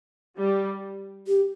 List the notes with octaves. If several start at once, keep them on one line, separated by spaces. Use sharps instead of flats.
G3
G4